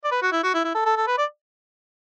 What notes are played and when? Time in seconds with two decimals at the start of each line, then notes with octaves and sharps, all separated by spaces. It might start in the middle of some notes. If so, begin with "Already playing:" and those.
0.04 D5
0.11 B4
0.22 F#4
0.32 E4
0.43 F#4
0.54 E4
0.64 E4
0.75 A4
0.86 A4
0.97 A4
1.07 B4
1.18 D5